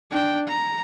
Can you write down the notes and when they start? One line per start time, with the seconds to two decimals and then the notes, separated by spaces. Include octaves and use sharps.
0.11 D4 G5
0.48 A#5